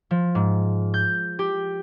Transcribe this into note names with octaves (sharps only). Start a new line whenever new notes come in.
F3
G#2
G6
G4